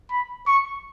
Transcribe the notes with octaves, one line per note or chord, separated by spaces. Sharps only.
B5
C#6